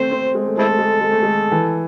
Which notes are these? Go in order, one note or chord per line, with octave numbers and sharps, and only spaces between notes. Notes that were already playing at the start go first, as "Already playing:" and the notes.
Already playing: A3 C4 C5
C4
G#3
A3
G#3 C4 E4 A4
A3
G#3
A3
G#3
A3
G#3
E3